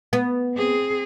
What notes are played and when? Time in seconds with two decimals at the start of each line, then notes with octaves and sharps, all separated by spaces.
0.13 B3
0.55 C4 G#4